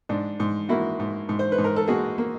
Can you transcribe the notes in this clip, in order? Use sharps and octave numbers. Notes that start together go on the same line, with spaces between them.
G#2 D4
G#2
A#3 E4 F#4
G#2
G#2
C5
B4
G#2
A#4
A4
A#3 F#4 G#4
A#3